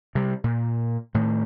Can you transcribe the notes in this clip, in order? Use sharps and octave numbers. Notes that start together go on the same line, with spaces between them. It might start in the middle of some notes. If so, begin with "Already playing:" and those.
C3 G3
A#2
A2 D#3 A3